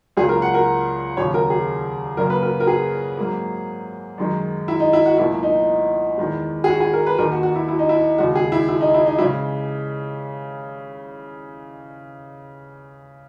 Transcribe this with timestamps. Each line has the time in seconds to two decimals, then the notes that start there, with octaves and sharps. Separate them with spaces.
0.17 C#2 C#3 F#3 A#3 G#4
0.29 A#4
0.42 F#5
0.54 A#4
1.17 D#2 C#3 F#3 C#5
1.34 A#4
1.50 G#4
2.17 F#2 C#3 F#3 A#3 A#4
2.30 B4
2.42 A#4
2.60 A#4
2.67 G#4
3.17 G#2 F#3 A#3
4.18 F#2 D#3 G#3
4.68 E4
4.80 D#4
4.93 E4
5.06 F#4
5.18 C#2 B2 F#3 A#3 E4
5.43 D#4
6.18 E2 D#3 G#3
6.64 G#4
6.68 F#4
6.80 G#4
6.93 A#4
7.07 B4
7.18 D#2 D#3 A#3 A#4
7.32 F#4
7.43 F#4
7.56 E4
7.68 E4
7.79 D#4
7.89 E4
8.18 D#2 C#3 G#3 F#4
8.35 G#4
8.52 E4
8.68 E4
8.81 D#4
8.94 E4
9.06 D#4
9.18 C#3 E3 G#3 E4